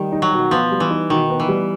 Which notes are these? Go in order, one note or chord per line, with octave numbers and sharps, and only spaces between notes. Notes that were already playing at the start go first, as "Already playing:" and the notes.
Already playing: D#3 G3
D#4
F#3
B2
F3 B3
G3
E3
D#4
B2 D#3
B3
E3
G3